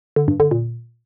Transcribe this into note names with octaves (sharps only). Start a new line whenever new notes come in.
D3
G2
D3
A#2